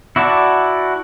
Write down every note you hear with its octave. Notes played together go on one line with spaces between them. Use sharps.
E4 F#4 D5 F#5 A5